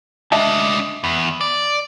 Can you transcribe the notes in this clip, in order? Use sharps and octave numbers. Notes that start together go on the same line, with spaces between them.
G#3 D4 D#5 E5 A5
E2
D5